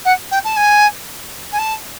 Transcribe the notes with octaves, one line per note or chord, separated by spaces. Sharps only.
F#5
G5
A5
G#5
G#5
A5